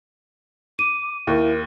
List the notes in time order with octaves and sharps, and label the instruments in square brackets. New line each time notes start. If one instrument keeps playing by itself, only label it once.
[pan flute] D6 [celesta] D#7
[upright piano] D#2 [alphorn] E4 [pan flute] A#4